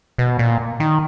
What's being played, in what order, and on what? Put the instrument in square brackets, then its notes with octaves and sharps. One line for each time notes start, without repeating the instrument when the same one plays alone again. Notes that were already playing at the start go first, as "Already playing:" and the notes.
[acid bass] B2
A#2
D#3